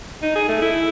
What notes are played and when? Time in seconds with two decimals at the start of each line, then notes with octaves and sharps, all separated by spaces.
0.22 D#4
0.35 G#4
0.49 A3
0.62 E4